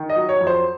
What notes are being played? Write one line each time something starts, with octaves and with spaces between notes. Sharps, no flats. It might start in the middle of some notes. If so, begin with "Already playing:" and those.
Already playing: D#3
D#5
F#3
C#5
F2
C5